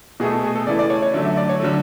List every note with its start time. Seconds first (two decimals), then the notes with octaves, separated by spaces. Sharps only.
0.20 B2 A3 G#4
0.32 A4
0.44 G#4
0.55 A4
0.67 C#3 E3 A3 D5
0.79 D5
0.90 C#5
1.02 C#5
1.14 D3 F#3 A3 D5
1.25 E5
1.37 D5
1.49 C#5
1.60 D3 F#3 A3